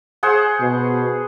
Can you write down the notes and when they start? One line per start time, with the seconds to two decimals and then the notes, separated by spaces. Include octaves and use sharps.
0.23 G#4 C5 F#5
0.60 B2